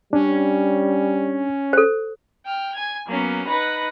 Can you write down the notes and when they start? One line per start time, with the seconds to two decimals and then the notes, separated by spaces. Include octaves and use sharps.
0.13 G3 C#4 D4
1.73 A4 C5
2.44 G5 F6
2.74 G#5 G#6
3.07 F#3 A#3 B3 C#4
3.47 D#4 B4 F#5 B5 A#6